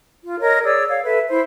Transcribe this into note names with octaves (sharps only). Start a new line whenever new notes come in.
F4
A#4 C#5 D#5
G#4 C#5 D5 E6
C#5 F5
A4 B4 E5
E4 C5